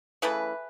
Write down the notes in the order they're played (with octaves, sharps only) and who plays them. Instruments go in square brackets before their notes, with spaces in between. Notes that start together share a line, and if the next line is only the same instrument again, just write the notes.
[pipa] C#3 E3 A3 G#4 B4